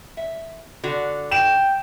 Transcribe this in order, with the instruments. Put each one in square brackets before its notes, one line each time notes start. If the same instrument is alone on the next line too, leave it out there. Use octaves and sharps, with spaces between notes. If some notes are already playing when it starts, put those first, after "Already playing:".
[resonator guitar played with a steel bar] E5
D3 F#4
[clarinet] G5 [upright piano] E7